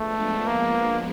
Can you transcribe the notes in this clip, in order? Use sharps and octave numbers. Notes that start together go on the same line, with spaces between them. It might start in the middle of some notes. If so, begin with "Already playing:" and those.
Already playing: F3 G#3 A3 B3 D4
A#3